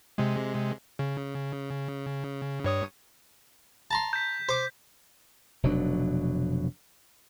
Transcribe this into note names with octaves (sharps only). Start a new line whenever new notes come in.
C3 G#3
C#3
G2 C#5 D#6
A5 A#5 C6
G6 B6
C5 D6
F1 B2 F#3 D4